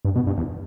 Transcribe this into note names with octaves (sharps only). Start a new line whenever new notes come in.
G2
B2
G2
E2